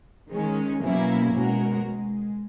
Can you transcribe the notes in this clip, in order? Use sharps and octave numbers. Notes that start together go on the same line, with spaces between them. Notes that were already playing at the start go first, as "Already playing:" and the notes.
D#3 G#3 C#4
B2 F#3 A#3 C#4 E4
B2 G#3 C#4 F#4 A#4
G#3